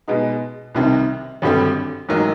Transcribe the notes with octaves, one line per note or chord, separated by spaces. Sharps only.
B2 G#3 B3 D#4
C2 C3 D#3 G3 C4
G#1 G2 D3 G3 C4
A1 G#2 D#3 F#3 A#3